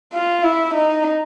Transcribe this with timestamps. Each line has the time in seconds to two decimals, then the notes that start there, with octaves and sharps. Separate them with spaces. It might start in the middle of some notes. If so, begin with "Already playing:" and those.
0.13 F4
0.44 E4
0.74 D#4